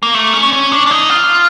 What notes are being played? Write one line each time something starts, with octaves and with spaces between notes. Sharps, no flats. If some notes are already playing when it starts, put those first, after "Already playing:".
A#3
A3
C#4
C#4
D4
D4
D#4
F4